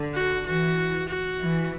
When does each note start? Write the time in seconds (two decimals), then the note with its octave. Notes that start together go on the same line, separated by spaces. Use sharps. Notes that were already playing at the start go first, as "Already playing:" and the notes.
Already playing: D3
0.15 F#4
0.46 E3 F#4
1.09 F#4
1.40 E3